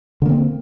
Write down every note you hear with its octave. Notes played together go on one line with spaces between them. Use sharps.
D3 A#3 C4